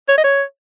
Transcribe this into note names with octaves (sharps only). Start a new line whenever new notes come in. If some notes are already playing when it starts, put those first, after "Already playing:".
C#5
D#5
C#5